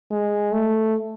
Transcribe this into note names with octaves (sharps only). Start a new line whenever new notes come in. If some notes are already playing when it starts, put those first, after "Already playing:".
G#3
A3